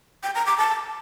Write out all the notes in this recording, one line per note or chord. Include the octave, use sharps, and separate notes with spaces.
G5
A#5
D6
A5